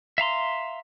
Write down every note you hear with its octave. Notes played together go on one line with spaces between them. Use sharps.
E5 F5 A#5 C6